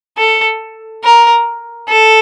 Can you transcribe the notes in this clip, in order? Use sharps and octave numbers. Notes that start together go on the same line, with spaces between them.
A4
A#4
A4